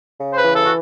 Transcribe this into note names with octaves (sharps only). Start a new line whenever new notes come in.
C#3
C5
B4
E3
A4
F#4